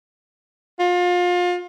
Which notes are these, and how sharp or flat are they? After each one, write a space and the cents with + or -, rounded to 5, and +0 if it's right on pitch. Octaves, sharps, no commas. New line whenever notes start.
F4 +30